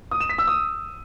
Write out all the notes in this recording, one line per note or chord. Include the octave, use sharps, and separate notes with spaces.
D#6
E7
B6
E6
D#6